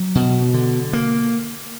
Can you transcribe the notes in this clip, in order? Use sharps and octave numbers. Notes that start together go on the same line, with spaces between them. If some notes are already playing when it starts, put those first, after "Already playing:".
Already playing: F#3
B2
D3
A#3